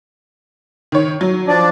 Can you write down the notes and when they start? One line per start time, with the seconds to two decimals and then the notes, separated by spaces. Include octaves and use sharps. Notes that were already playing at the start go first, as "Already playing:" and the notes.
0.92 D#3 C#5
1.21 F#3
1.48 F3 D4 D5